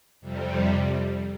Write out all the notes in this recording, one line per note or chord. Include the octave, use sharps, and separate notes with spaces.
F2 C3 G3